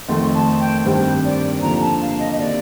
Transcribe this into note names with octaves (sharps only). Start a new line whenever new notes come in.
F2 D#3 A3 C6
A5
G5
G2 D#3 G3 C4 C5
D5
D#2 D3 F3 A#5
A5
F5
D#5
D#5
C3 D#3 A#3 D5